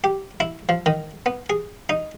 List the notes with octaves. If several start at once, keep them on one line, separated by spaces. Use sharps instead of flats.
G4
E4
F3
D#3
B3
G#4
D#4